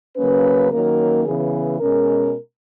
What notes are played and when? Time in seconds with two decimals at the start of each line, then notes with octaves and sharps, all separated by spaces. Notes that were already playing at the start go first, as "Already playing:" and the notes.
0.16 C#3 F#3 A#3 C#4 B4
0.71 D#3 F#3 A#3 C#4 A#4
1.25 C#3 E3 B3 G#4
1.80 B2 G#3 C#4 A#4